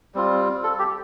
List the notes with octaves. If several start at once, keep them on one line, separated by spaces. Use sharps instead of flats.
G3 C4 F4
A4
G4